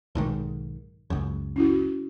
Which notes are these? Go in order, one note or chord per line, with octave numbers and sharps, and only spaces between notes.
B1 G#2 D#3
C#2 F#2
C#4 E4 F#4